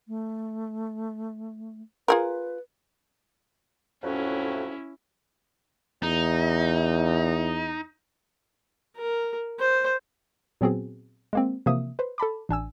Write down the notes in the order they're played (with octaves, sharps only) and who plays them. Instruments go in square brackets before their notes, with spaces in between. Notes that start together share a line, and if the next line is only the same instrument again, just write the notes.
[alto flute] A3
[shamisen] F4 G#4 A#4 [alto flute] B4
[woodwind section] F2 A2 F#3 [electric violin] C#4 E4
[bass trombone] E2 [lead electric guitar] D#4
[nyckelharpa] A#4
C5
[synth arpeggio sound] A#2 F#3 B3 C4 F#4 G#4
G#3 A#3 C4
C3 E3 F3 A#3 E5 D#6
B4 C5
A4 A5 B5 D6
A1 D4 G#5 E6